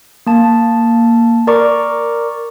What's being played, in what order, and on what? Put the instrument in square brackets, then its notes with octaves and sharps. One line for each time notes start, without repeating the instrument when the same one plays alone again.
[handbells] A#3 A5
A#4 D5 A#5 C#6 D6